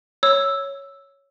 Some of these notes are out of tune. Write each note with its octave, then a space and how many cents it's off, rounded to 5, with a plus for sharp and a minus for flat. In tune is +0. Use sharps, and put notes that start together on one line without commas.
C#5 +0 E6 +0